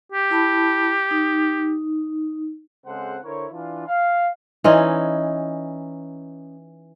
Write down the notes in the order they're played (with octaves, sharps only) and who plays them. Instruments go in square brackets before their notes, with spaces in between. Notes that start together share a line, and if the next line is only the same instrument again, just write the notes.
[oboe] G4
[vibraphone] E4 A5 B5
D#4
[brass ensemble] C#3 G#3 C4 A4 C5 F#5
D3 E4 A#4 C5 C#5
E3 D4 F4
F5
[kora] E3 C#4 D#4 [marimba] D5 D#5 C6